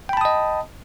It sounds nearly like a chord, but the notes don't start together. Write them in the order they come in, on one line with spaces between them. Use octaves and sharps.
G5 B5 A5 D#6 D#5